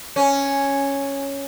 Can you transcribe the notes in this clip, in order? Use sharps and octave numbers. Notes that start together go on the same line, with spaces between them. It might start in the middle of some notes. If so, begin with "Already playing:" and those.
C#4